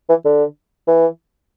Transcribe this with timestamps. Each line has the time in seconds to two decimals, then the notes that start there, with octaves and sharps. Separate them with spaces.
0.09 E3
0.25 D3
0.88 E3